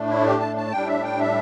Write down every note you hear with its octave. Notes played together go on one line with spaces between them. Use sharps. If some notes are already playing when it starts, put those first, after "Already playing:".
Already playing: A2 A3 D4
E4
G4
A5
A5
A2 G3 D4 G5
E5
G5
E5